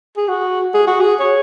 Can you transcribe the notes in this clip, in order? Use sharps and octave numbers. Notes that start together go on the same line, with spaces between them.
G#4
F#4
G#4
F#4
G#4
C#5